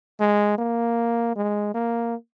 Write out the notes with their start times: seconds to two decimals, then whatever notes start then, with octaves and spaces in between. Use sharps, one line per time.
0.20 G#3
0.58 A#3
1.36 G#3
1.74 A#3